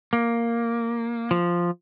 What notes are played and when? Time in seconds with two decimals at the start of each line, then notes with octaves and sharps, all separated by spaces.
0.13 A#3
1.31 F3